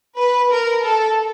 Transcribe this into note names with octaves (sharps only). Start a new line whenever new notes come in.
B4
A#4
A4